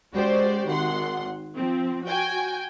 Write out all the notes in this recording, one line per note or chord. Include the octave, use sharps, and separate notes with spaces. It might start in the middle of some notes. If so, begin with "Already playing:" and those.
G#3 C#4 F#4 G4 C5 D5
G#1 D#3 F#5 C6
F3 C4
F#4 G5 G#5